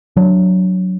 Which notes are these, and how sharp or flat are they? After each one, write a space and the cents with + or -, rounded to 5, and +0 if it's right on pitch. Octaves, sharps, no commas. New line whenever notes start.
F#3 +0 D4 +0